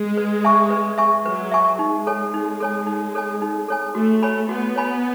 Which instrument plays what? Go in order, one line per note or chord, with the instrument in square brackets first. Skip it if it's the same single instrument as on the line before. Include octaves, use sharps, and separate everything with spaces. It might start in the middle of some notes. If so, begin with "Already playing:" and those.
Already playing: [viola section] G#3
[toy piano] B4
E5 G#5 C#6
B4
E5 G#5 C#6
[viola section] F#3 [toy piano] B4
[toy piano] E5 G#5 C#6
[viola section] G#3 [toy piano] D#4
[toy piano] A4 C#5 G#5
D#4
A4 C#5 G#5
D#4
A4 C#5 G#5
D#4
A4 C#5 G#5
[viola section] A3 [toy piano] F#4
[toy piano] C#5 G#5 B5
[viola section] B3 [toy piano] F#4
[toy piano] C#5 G#5 B5